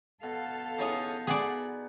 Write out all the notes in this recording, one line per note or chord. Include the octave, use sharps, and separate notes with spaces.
B2 A4 F5
E3 C#4 D#4 G#4
B3 G#4 D5 E5 F#5